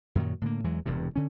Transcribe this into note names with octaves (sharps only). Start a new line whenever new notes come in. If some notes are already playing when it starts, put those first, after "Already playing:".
F#2 A#2 D#3 F#3
A2 D3 G#3 A#3
E2 E3 F#3 G#3
E1 E2 G2 C3
D3 C#4